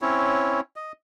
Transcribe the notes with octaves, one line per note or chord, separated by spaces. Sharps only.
C4 C#4 E4 C#5
D#5